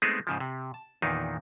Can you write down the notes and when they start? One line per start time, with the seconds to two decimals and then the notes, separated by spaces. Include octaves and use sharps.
0.02 G#3 A3 B3 C4 D#4 G#4
0.27 G#2 C#3 F3
0.40 C3
0.74 A5
1.02 E2 A#2 D#3 E3 D#4